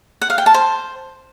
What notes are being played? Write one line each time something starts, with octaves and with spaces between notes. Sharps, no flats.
F#5
F5
G5
A5
C5